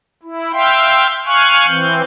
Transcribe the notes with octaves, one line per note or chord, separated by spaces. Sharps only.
E4
E5 F5 G5 C6
F5 G#5 C#6 F6 F#6
E3 C4 G6